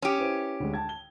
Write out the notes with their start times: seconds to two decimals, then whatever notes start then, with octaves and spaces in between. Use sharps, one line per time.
0.02 C#4 G4 D#6
0.18 E4 B4 C5
0.60 D2 G#3
0.74 G5 A5 G#6
0.89 G7